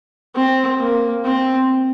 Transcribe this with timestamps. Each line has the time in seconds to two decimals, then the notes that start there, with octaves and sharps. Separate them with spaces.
0.35 C4
0.80 A#3
1.25 C4